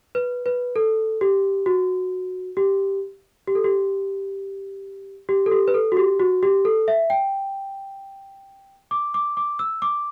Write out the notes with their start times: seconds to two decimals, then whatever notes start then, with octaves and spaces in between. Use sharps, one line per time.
0.15 B4
0.46 B4
0.76 A4
1.21 G4
1.66 F#4
2.57 G4
3.47 G4
3.55 A4
3.64 G4
5.29 G4
5.46 A4
5.51 G4
5.68 B4
5.74 A4
5.92 F#4
5.97 G4
6.20 F#4
6.43 G4
6.65 A4
6.88 E5
7.10 G5
8.91 D6
9.14 D6
9.37 D6
9.59 E6
9.82 D6